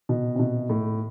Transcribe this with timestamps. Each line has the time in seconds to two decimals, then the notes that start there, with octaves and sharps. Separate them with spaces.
0.09 B2
0.35 C3
0.39 B2
0.69 A2